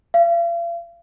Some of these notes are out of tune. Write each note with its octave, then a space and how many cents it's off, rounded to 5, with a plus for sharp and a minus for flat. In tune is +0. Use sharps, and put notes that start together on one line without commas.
F5 -40